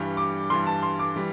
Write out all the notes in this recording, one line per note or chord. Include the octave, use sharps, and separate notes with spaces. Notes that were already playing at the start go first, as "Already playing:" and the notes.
Already playing: G2 E3 G3
D6
G2 E3 G3 C6
A5
C6
D6
E3 G3